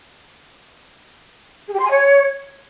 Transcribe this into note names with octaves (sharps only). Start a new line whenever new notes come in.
G#4
G4
C6
G#5
C#5